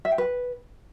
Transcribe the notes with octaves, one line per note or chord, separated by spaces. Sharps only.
E5
G5
B4